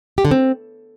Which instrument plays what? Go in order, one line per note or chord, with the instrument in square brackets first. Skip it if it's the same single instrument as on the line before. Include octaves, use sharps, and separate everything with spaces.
[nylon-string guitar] G4
D3
C4